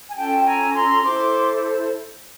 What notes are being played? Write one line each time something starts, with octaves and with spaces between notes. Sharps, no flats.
G#5
C#4 F4 A4 G5 A5
G#5 A#5
A#5 C6
E4 A4 C5 C6 D6